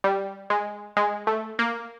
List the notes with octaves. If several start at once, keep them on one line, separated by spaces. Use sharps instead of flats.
G3
G#3
G#3
A3
A#3